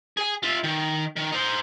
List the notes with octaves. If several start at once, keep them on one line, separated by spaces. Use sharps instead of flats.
G#4 G#5
F4 E5
D#3
D#3
D#4 C5